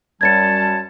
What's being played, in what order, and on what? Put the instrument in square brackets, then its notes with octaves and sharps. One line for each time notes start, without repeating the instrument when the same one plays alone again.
[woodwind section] F#2 G3 A5 [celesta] G#6 A6 C#7